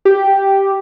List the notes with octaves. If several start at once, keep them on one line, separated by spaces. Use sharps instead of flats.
G4